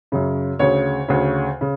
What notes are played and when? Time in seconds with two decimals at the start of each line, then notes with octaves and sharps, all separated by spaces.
0.12 F#2 C#3
0.59 D2 C#3 C#5
1.08 D2 C#3
1.61 C#3